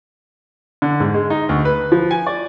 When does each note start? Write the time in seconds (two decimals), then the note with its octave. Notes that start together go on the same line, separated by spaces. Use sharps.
0.82 D3
1.00 G#2
1.14 G#3
1.30 D#4
1.49 D2
1.65 B4
1.92 F3
2.11 G#5
2.26 D5